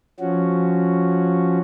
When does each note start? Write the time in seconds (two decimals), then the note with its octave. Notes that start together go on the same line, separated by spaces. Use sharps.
0.20 F3 C#4 F#4